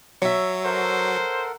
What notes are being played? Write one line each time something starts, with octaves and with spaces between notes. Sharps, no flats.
F#3 C#5 E5
A4 A#4 C5 F#5